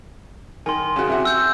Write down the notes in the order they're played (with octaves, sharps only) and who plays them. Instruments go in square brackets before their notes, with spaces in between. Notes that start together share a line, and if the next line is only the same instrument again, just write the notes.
[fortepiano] D#3 [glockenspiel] G#5 C6
[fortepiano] C#3 F#4
C3 E4 F#4
[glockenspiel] E6 G6